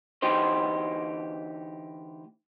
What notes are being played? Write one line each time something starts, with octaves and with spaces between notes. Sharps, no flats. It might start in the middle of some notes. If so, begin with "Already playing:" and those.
D2 E3 D#4 G4 C5